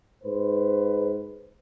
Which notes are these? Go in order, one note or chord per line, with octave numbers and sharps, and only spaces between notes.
G#2 B4 C5